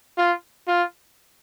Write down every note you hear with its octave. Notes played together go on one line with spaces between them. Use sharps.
F4
F4